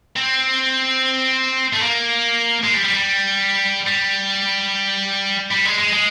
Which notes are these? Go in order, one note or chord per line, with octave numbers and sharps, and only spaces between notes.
C4
A3
A#3
G#3
G3
G3
G3
G3
G3
G#3
G#3
G#3